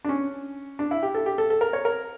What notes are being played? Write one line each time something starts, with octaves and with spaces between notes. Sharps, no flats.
D4
C#4
D4
E4
G4
A4
G4
A4
A4
A#4
C#5
A#4